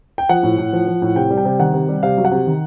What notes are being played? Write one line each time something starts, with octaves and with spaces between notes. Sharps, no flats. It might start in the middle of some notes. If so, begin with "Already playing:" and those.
G5
F3 F#5
A2
A2
F3
F3
A2
C3 G5
G3
G5
C3
D#3 F#5
C3
G3
C3 F5
F#3
F#5
C3
D#3